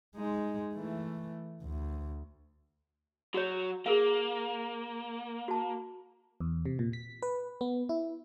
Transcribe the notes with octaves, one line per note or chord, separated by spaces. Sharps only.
G#3 D#4
E3 A3
D2
F#3 F#4 C#5
A#3 G#4 A#4 F5
F#4 A5
E2
C3
A#2
B6
B4
B3
E4